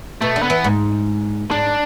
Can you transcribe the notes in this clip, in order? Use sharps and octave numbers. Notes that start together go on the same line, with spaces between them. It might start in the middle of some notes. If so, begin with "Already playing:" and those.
B2 A3
D3
B3
E3
G#2
G#2 D4